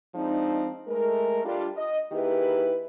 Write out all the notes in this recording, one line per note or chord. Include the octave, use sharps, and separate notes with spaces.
F3 G#3 C4 D4 D#4
G#3 A3 A#4
G3 D4 F4
D#5
D#3 A#3 E4 G4 G#4 B4